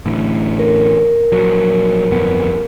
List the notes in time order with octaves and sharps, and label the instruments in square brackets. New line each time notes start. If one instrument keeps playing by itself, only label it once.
[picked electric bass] A1 A2 D3
[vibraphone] A#4
[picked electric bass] A#1 F#3
G1 F2 B3